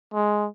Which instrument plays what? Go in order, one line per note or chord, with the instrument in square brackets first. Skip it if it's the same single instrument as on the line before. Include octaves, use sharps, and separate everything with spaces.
[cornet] G#3